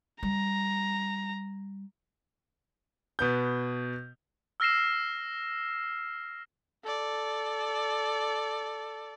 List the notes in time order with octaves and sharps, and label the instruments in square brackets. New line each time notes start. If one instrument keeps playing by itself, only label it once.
[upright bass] G3 [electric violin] A#5
[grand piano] B2 B3 G6
[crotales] E6 F6 A#6 C7 E7
[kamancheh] A4 D5